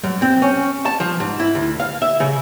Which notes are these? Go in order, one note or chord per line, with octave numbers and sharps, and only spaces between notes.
F#2
C4
C#4
A5
F3
G#2
E4
D2
F5
E5
C#3